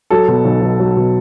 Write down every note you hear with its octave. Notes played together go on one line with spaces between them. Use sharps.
F#3 A4
B2
B1
B1
F#3
B2